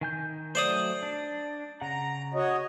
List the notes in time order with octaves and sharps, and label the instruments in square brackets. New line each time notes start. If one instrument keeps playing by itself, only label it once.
[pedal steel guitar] D#3 G#5 G6
[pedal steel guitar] F#3 A3 [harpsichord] C5 D5 D#6
[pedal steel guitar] D4
[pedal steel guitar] C#3 F#5 [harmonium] A#5
[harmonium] F#4 C#5 D#5